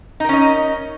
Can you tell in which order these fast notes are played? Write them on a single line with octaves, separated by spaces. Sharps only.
D#4 A#4 C#4 D#5